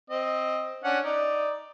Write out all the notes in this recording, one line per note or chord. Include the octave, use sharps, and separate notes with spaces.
C4 D#5
C#4 D4 F#5
D#4 D5